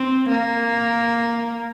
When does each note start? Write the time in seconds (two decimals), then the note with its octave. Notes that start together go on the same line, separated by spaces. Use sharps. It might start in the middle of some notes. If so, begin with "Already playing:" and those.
Already playing: C4
0.28 A#3